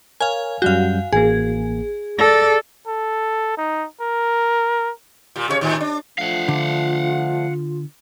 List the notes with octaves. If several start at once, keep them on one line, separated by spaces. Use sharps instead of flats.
A#4 C#5 F5 G#5
F#2 G3 F#4 F5 G6
A1 A#3 G#4
A4 D5 A#6
A4
D#4
A#4
A#2 G3
C#3 G3 C#5
A2 D#3
D4
F3 A3 D4 F4 F5 F#5
D3